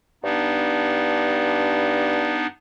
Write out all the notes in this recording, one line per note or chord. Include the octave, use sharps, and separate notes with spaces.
G2 B3 D4 D#4